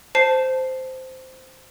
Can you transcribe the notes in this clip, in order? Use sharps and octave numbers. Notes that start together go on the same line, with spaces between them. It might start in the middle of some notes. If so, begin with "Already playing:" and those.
C5 A5 C7